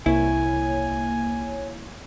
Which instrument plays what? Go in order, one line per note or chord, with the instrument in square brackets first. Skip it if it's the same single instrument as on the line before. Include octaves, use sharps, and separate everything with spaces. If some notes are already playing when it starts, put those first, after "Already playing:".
[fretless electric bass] C2 [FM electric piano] A#3 C#5 [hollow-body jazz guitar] E4 [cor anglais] G#5